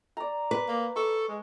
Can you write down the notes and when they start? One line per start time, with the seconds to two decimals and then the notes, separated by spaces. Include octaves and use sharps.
0.17 D5 A#5
0.51 B4 D6
0.68 A#3
0.96 A4 C#6
1.28 G#3